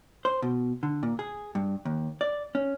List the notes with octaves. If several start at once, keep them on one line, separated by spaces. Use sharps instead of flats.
C5
B2
D3
A#2
G#4
G2
D#2
D5
C#4